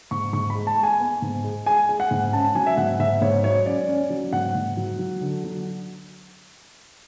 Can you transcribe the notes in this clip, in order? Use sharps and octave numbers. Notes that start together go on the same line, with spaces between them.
G#2 C#6
G#2 C#6
B5
G#3
A5
G#3
G#5
B3
G#2
G#3
G#3 G#5
G#3
F#5
G#2
C#4 A5
F#3 G#5
E5
G#2 F#5
G#2 E5
G#2 C#5
F#3 C#5
C#4 D5
C#4
F#3
G#2 F#5
G#2
F#3
F#3
D3
F#3